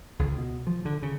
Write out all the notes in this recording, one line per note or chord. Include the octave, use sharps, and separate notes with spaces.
C#2
B2
F3
D3
C#3